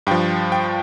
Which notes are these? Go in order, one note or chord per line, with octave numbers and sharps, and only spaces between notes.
G2 F3 G5
G5